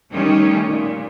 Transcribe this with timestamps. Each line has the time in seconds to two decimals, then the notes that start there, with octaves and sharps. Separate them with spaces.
0.13 D#3 G3 A3 C#4
0.68 A#2